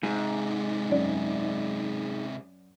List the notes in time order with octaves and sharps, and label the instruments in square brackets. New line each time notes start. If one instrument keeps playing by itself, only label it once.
[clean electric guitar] G#2 [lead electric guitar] C3 G#3
[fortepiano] F#2 D5